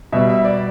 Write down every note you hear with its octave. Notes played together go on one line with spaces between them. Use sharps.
B2 G3 E5
E5
D5